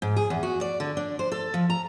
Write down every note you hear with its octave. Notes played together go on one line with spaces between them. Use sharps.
G#2
G#4
E2
F#4
D5
D3
D4
C5
A4
F3
A#5